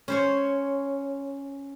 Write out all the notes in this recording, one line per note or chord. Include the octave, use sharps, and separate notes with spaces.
C#4 C5 C#5